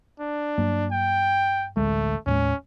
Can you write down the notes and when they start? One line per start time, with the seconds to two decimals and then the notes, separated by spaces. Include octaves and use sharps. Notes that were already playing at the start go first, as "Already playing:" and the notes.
0.20 D4
0.58 G2 F#3 A#3
0.92 G5
1.77 A1 D2 G#3 A3
2.26 D#2 A2 G#3 C#4